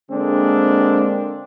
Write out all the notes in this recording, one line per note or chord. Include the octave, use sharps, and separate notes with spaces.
D3 G#3 A#3 C4 D4